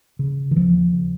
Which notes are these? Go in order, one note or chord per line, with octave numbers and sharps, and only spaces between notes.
C#3
D#3
D#2 F3
C#3